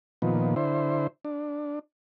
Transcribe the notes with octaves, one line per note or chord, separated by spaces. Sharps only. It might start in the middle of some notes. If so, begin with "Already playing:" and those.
A#2 D#3 F3 B3
D3 E4 C5
D4